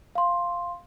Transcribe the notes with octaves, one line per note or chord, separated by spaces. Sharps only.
F5 C6